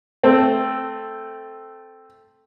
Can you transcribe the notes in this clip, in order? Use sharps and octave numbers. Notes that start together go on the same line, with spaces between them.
A3 C4